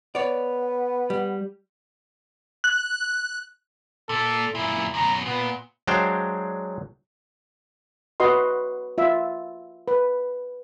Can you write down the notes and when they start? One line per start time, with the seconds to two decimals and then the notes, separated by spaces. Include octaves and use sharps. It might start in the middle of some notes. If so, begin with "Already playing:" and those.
0.15 B3 C#5 D5
1.10 G3
2.64 F#6
4.09 A#2 A4
4.55 F#2 A#2 E4
4.94 F#2 B2 A#5
5.26 A#2 B3
5.87 F#3 G#3 D4 C5 F5 G5
8.20 F#4 B4 D#5 C6
8.98 F4 E5
9.88 B4